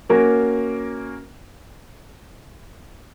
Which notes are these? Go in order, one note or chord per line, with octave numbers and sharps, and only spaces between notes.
A#3 C#4 F#4 A#4